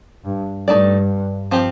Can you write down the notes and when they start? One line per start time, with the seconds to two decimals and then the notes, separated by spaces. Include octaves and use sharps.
0.25 G2
0.68 G2 A3 D#4 A4 D5
1.51 F3 C4 G4